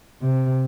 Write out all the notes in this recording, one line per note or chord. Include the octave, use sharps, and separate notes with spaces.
C3